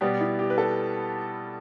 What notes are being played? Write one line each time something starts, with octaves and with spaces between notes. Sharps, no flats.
B2 G3 B3 G4
E4
G4
B4
A4